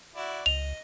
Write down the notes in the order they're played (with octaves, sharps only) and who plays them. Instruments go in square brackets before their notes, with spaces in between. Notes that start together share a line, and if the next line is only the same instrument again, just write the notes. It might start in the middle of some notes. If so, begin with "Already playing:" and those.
[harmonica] E4 F#4 D5
[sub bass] C#2 [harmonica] D#5 [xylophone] F7